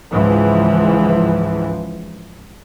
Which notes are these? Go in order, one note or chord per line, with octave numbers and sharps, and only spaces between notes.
C#2 G#2 E3 F3